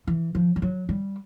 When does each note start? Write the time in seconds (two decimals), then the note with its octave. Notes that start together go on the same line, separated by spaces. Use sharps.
0.07 E3
0.35 F3
0.56 G3
0.62 F#3
0.89 G3